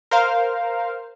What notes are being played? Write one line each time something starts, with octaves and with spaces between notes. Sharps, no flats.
A#4 C5 F5